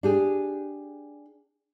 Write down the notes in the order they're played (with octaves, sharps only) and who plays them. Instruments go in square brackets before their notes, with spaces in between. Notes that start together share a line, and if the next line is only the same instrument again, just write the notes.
[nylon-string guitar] D4 G4 G#4